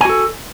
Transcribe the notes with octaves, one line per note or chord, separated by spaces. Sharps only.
F#4 A4 G#5